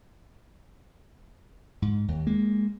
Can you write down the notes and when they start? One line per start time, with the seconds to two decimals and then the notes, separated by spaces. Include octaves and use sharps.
1.82 G#2
2.08 D#2
2.27 G#3 A#3